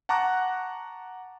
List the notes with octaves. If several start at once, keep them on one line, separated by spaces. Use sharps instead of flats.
F#5 A5 A#5 C#6 D6 F#6